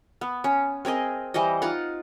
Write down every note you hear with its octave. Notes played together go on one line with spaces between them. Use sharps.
B3
C#4
C4 G#4 A#4 D#5
E3 G3 C5 D#5
D#4 F4 F5 F#5